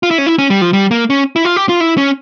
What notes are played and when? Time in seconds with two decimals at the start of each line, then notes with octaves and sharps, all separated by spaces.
0.03 F4
0.11 E4
0.18 C#4
0.27 E4
0.38 C#4
0.50 G3
0.62 F3
0.73 G3
0.91 A#3
1.10 C#4
1.36 E4
1.45 F4
1.56 G4
1.69 F4
1.80 E4
1.98 C#4